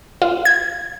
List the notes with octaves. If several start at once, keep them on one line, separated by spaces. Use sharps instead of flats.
F4
G#6